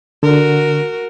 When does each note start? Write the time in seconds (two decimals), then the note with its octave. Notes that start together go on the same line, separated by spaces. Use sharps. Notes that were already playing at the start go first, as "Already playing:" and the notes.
0.23 D3 F#4 A#4